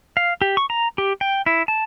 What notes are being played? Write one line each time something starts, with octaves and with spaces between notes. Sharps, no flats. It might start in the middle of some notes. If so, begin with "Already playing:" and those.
F5
G4
C#6
A#5
G4
G5
E4
A5